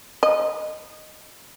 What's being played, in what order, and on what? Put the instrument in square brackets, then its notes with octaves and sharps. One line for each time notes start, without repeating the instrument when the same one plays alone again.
[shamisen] D#5